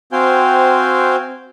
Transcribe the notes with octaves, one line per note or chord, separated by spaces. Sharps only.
C4 F#4 C5 F5 G5 G#5